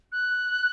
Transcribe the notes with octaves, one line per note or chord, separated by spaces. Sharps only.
F#6